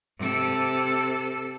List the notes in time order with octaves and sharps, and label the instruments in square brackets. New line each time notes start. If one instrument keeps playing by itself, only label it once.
[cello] C3 A4